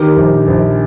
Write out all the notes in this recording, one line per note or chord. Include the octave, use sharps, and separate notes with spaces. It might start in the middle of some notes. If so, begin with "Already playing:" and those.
Already playing: D#3 G4 A#4
A#1
A#1